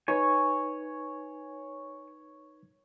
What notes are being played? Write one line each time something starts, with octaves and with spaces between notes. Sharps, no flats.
D#4 B4 C#5 G#5 C#6